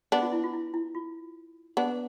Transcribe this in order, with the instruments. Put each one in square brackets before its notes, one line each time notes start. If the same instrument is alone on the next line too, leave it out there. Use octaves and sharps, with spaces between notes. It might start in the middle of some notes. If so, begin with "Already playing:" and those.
[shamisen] B3 D4
[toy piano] F4
E4
F4
E4
E4
F4
[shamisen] B3 D4